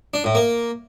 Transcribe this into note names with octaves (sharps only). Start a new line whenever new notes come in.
D4
A2
A#3